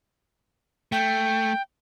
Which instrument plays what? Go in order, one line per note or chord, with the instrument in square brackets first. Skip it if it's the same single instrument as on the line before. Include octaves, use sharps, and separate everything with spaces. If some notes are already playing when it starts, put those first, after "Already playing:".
[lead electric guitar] A3 [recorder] G5